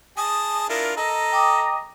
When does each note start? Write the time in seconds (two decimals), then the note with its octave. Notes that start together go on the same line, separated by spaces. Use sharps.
0.17 G#4 A5 D#6
0.69 D4 E4 F4 A#4
0.97 A4 D#5 A#5
1.32 G5 D6 D#6